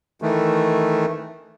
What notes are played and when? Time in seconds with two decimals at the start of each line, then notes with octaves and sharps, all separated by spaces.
0.22 D#3 E3 A3